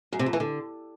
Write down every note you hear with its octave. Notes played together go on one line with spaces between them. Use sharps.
F#2
C3
F2
E3
D3